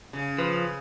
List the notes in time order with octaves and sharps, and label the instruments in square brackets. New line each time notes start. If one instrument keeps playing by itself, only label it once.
[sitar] C#3
[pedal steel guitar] F3 [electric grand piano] B4